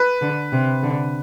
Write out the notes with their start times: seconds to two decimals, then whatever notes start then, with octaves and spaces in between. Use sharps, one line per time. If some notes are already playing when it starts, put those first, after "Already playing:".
Already playing: B4
0.21 D3
0.52 C3
0.83 D3